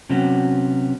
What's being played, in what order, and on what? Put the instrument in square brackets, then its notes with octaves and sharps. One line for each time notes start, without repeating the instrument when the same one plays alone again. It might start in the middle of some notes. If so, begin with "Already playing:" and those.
[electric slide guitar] C3 F#3 B3 C#4 F#4